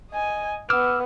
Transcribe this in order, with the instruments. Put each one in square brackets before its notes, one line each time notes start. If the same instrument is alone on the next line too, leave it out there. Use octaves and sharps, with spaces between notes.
[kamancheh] D#5 G#5
[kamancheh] B3 [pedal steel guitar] D6 E6 F6